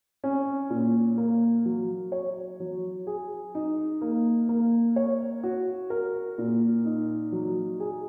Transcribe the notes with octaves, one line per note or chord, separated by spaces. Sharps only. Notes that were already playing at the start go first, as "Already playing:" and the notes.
C#4
A#2
A#3
F#3
C#5
F#3
G#4
D#4
A#3
A#3
C#5
F#4
A#4
A#2
D#4
F#3
G#4